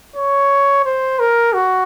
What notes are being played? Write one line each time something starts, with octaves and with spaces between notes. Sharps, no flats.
C#5
C5
A#4
F#4